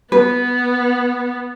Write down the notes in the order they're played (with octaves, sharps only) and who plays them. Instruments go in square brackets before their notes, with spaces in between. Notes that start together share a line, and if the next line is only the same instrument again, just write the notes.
[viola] B3 [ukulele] B4